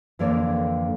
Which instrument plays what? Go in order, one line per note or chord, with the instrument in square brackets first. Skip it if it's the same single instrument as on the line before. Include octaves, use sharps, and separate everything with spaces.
[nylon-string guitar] F2 D3 E3 A#3 C#5 D5